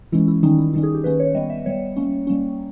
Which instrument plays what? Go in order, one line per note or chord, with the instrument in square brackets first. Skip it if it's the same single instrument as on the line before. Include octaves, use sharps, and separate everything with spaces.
[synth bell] E3 G#3 C#4 E4
E4
D#3 G3 C#4 D#4
E4
D#3 G3 C#4 D#4
G#4
G4
D#3 A#3 C#4 B4
C#5
G3 B3 D#5
E5
G3 B3 C#5
G3 A#3 C#4
G3 A#3 C#4